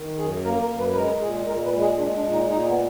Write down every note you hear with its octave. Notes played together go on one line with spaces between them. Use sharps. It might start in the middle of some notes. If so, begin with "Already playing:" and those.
Already playing: D#3
F#2 G#4
A#3 A#4
A#4
F#2
B4
B4
G#3 A#4
A#2 G#4
A#2 A#4
B4
G#3
G#4
G#3 D4
D4
A#2
D#4
A#2 D#4
B3